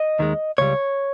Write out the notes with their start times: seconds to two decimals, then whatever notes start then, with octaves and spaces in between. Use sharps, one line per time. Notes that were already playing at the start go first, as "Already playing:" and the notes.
Already playing: D#5
0.19 D#2 D#3 G#3
0.58 C#2 C#3 G3 C#5